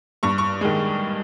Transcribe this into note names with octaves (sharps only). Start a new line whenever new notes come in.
G2 C#6
C#6
D#3 G#3